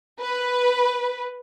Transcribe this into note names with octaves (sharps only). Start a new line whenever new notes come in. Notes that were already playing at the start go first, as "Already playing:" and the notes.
B4